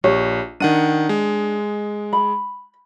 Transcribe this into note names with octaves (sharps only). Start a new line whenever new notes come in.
A#1 G4 C#5
D#3 D4 F#5 D#7
G#3
B5